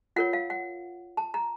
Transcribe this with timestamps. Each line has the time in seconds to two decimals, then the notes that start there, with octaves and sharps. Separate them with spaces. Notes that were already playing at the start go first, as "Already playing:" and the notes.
0.16 F4 A#4 C#5 F#5
0.33 F5
0.50 F#5
1.17 A5
1.34 A#5